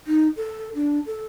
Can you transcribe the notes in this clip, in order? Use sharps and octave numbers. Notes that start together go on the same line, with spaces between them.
D#4
A4
D4
A4